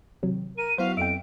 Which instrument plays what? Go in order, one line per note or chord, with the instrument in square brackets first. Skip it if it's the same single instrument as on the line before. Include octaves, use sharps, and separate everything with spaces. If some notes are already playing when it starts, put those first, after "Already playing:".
[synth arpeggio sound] C3 F#3 [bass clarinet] D#3
[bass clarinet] A#4 [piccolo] D#7
[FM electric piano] F#3 B3 E4 [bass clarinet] F#4 [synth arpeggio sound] C5 [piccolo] F5
[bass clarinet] F2 [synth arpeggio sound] E5 G5 [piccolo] D7